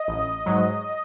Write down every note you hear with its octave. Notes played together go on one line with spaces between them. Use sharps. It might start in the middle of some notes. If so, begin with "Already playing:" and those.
Already playing: D#5
A1
G#2 F#3